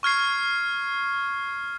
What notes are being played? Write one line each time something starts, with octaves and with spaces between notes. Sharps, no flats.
C#6 F6 G#6 C7